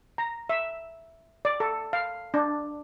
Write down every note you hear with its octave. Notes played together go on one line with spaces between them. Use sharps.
A#5
E5
D5
A4
F5
D4